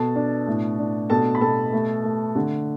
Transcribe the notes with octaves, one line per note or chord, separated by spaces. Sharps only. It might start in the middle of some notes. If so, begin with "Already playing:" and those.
Already playing: B2 A4 A5
D4
A2
D4
B2 A4 A5
B5
B2 A4 A5
A3
A3
D3